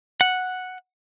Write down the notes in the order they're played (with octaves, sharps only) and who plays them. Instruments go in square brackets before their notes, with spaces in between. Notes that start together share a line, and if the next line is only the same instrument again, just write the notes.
[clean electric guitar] F#5